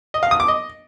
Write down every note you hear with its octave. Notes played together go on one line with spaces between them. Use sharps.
D#5
F5
D#6
D6
D#5